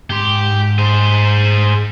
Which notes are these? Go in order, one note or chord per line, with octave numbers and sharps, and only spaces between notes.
G#2 G4 C6
G#4 C5